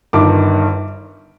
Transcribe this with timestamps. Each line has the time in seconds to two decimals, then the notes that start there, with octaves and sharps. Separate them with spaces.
0.13 G1 G2 D#3 D6